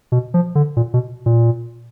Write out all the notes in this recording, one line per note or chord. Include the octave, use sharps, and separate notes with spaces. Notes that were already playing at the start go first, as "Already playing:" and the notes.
B2
F3
D3
A#2
B2
A#2